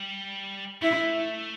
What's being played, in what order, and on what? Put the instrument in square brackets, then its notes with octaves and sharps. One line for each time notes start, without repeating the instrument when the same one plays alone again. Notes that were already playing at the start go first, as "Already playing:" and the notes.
Already playing: [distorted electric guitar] G3
[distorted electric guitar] A3 [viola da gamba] E4